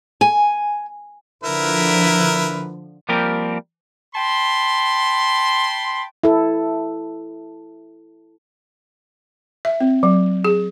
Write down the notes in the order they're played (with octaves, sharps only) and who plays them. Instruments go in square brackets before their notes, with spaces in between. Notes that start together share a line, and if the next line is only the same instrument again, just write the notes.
[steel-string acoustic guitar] G#5
[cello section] D3 F3 [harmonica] E4 A#4 B4
[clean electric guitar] F3 G3 A#3 C4 G4 A#4
[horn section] G5 A5 B5 C6
[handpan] E4 A4
[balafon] E5
C4
F#3
G#4